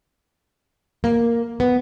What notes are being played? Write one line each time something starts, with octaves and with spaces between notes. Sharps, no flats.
A#3
B3